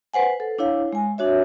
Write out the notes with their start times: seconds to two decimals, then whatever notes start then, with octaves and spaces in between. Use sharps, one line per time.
0.14 B4 C5 F#5 G#5
0.40 A4
0.58 D4 E4 C#5 F5
0.93 G#3 G#5
1.18 D4 F#4 C#5 E5